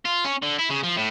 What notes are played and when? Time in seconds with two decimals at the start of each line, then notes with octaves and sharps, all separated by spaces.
0.05 F4
0.25 C#4
0.43 D3
0.59 E4
0.70 C#3
0.84 F3
0.97 A2